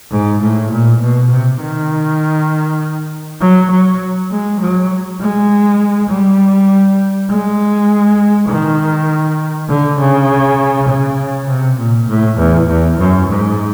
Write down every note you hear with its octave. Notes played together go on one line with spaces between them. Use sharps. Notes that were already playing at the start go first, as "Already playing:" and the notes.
G#2
A2
A#2
B2
C3
D#3
F#3
F#3
G#3
F#3
G#3
G3
G#3
D#3
D3
C#3
C#3
C3
A#2
A2
E2
E2
F#2
G#2